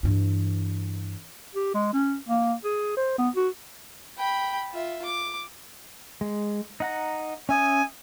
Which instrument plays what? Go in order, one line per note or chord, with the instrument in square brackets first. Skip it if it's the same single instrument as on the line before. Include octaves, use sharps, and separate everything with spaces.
[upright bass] G2 E3
[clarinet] G4
G#3
C#4
A#3
G#4
C5
B3
F#4
[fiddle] G5 B5
F4 E5
D6
[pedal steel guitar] G#3
D#4 F#5 A#5
[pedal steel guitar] C#4 E5 D#6 [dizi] G#5